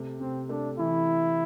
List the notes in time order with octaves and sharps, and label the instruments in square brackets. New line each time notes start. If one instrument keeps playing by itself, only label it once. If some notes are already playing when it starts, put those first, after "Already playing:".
Already playing: [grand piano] C3 A3
[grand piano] C3 [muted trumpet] C4
[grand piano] A3 [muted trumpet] D4
[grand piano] E3 [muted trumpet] E4